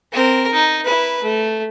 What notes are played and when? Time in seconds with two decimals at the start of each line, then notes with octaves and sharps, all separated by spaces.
0.12 C4 A#4
0.52 D#4
0.84 E4 B4
1.22 A3